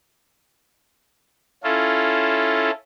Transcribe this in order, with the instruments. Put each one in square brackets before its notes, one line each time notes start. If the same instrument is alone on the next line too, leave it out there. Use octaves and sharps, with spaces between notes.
[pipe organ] C#4 E4 F4 A4